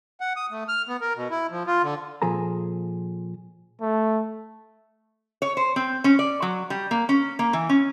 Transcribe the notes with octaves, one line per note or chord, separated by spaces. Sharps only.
F#5
D#6
A3
F6
B3
A#4
B2
E4
F3
F4
D3
A#2 F3 G#4 A4 A#5
A3
C#5
C5
C4
C#4
D5
F#3
G3
A#3
C#4
A#3
E3
C#4